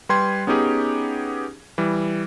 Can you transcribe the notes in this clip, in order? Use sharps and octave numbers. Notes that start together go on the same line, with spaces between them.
G3 B4 G5 C6 G#6
B3 C#4 D#4 G4 G#4
E3 G3